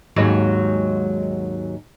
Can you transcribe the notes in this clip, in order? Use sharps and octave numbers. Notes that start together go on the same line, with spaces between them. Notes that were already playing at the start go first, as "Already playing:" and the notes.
D#2 G#2 F#3